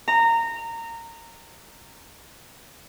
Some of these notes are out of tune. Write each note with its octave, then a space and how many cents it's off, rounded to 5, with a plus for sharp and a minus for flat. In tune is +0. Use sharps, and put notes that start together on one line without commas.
A#5 -20